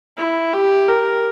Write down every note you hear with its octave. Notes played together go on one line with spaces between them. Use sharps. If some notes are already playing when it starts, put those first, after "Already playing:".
E4
G4
A#4